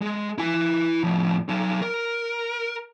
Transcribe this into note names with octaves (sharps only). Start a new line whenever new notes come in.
G#3
E4 G#5
A2 F3
F#3 D#4
A#4